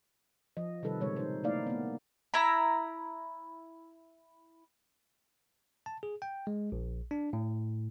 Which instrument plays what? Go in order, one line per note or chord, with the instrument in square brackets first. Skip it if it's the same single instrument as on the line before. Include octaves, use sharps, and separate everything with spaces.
[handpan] F3 D#5
C3 D#3 G3 A4 B4
A#2 C#3 G#3 C#5
D#4 C5
A3 A#3 D#4 E4 D5 F5
A#3 B3
[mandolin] E4 A#5 B5
[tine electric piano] A5
G#4
G5
G#3
A#1
D4
A2